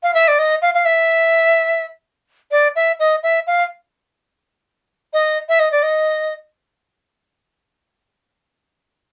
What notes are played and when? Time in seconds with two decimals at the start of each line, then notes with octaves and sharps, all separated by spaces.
0.03 F5
0.14 E5
0.28 D5
0.39 D#5
0.62 F5
0.74 F5
0.85 E5
2.51 D5
2.76 E5
2.99 D#5
3.23 E5
3.47 F5
5.13 D#5
5.49 E5
5.60 D#5
5.72 D5
5.83 D#5